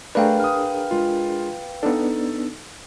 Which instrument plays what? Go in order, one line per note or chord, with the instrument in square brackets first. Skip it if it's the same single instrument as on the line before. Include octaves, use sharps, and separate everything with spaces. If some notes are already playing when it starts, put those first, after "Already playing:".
[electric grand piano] A3 D5 [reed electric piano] D4 G#4 A#4 [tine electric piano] B4 F5 G5
[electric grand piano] D#6 F6
G#3 F4
[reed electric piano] B3 D4 [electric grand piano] D#4 A4